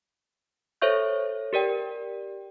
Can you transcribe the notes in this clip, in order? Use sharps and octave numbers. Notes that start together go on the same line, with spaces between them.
A4 C5 C#5 E5 C#6 G6
G4 A#4 D5 G5